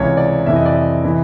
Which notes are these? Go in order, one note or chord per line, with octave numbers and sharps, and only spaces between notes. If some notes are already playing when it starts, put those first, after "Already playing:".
Already playing: C#2 C3 E3 C#5
D5
F2 C3 E3 E5
D#5
D5
D#5
C3 E3